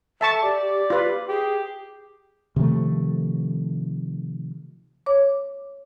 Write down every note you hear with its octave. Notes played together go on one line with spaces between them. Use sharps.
A4 E5 A5 C#6
G4 D5
F4 B4
G4 G#4
C3 D#3 F3 A3
C#5 D6